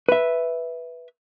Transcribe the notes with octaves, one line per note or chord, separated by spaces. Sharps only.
B4 E5